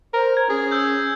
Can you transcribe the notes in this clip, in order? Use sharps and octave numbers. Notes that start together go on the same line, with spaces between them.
A#4 C5
C5 G#6
C#4 G#4
E6 G6